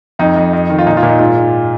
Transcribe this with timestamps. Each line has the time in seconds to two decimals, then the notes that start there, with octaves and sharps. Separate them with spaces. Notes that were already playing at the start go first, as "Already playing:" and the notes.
0.19 F2 D#4
0.36 F2
0.53 F2
0.70 D#3
0.79 F4
0.86 A#2 D#4
0.97 F4
1.02 A#2
1.09 D#4
1.19 G#2 F4
1.36 G#2